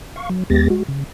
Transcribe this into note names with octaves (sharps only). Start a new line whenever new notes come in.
F5 C#6
F#3
D#2 G#3 B3 G4 A6 A#6
G#3 F#4
C#3